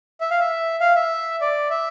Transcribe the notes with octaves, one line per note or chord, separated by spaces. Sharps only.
E5
F5
E5
F5
E5
D5
E5